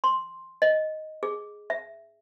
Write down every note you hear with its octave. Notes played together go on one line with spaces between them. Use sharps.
C6
D#5
G#4
E5